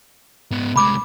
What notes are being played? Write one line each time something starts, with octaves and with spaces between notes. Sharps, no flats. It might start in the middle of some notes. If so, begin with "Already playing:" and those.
G#2 B3
C2 G#3 B5 D6